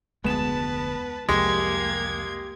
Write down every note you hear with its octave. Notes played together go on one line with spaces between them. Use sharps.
F1 D2 G#3 B3 B4 A5 E7
C2 F2 G#3 A#3 G4 G#6